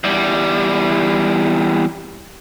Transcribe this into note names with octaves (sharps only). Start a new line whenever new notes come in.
E2 G3